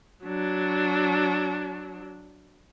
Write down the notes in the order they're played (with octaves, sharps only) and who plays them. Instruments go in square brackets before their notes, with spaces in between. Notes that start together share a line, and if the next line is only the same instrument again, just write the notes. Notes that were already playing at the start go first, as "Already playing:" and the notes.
[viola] F#3 D4